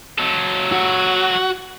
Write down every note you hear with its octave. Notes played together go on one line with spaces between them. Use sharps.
F#3 A4
F#4